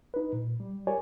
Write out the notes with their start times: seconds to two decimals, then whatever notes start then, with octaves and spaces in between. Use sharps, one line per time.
0.14 D#4 B4
0.33 A#2
0.60 G3
0.87 G4 A#4 C#5 D5 G#5